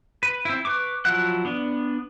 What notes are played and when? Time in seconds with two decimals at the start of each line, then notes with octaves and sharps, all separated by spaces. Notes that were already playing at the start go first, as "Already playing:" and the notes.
0.23 B4
0.45 C4 E4
0.65 B4 C#6 D6
1.05 F3 F#3 E4 F#5 F#6
1.45 B3 D4